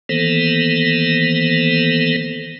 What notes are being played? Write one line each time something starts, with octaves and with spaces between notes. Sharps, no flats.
D#3 E3 A#3 B3 A4 C5